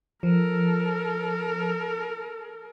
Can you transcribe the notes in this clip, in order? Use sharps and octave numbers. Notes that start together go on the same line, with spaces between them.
F3 A4 A#4